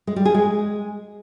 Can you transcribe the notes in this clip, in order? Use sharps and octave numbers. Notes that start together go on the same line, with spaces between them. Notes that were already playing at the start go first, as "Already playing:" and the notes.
G#3
G3
G#4
G#3